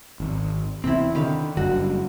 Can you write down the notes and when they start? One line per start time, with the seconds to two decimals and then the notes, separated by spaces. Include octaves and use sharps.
0.20 G#1
0.84 E2 C3 C4 E4
1.15 D3 D#3 B4 F5
1.57 F#1 G2 F#4